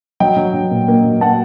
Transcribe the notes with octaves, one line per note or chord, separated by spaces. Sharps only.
F#3 D#5 G5
F#3
F#3
A#2
A#3
F#3
A#3 F#5 A5